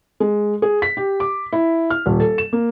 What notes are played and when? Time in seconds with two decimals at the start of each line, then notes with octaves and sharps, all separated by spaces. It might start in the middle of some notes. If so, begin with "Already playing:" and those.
0.20 G#3
0.62 G#4
0.82 B6
0.97 G4
1.20 D6
1.52 E4
1.90 F6
2.06 D#1
2.20 A4
2.38 E7
2.53 A#3